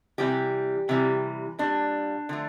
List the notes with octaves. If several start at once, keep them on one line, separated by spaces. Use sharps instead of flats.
C3 E3 G3 G4
C3 E3 G3
A#2 G3 D4
D3 F3 A3